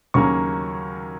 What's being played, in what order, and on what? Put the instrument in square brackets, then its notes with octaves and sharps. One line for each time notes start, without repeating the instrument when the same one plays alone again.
[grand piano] D#2 C#3 F#3 A#3 C#4 C#6